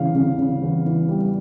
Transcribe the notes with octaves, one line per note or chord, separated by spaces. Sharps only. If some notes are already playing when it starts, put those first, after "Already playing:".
Already playing: E2 C#3 E3 F5
C#3
C#3
E2
E3
G3